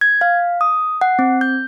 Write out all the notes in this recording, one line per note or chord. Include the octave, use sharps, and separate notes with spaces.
G#6
F5
D#6
F#5
C4
G6